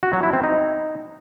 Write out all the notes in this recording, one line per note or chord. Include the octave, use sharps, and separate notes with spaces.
F#4
F#3
E4
C4
D#4